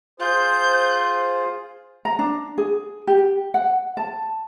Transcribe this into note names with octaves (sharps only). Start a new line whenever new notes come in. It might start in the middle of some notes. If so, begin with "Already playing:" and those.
F4 G#4 C5 G6
A#5
D4
G#4
G4
F#5
A5